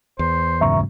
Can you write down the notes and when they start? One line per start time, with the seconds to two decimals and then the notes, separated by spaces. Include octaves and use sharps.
0.19 E2 C5
0.61 G#2 C#3 F#3 E5 A#5 C#6